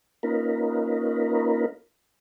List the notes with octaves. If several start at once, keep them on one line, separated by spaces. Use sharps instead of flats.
A#3 C#4 D#4 F4 A#4 B4